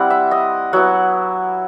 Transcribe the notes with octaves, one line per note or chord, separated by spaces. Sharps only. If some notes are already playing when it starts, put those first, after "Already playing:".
Already playing: G3 C4 E4 F#5
E5
D#5
F#3 B3 E4 F#5